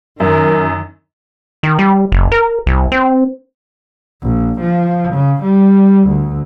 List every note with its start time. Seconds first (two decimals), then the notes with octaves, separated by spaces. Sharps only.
0.20 F#2 D#3 A#4
1.63 D#3
1.79 G3
2.12 F#1
2.32 A#4
2.66 C2
2.92 C4
4.23 A#1
4.61 F3
5.14 C#3
5.43 G3
6.08 D2